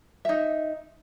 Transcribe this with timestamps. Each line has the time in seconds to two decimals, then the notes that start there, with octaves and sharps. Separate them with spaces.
0.25 D#4 E5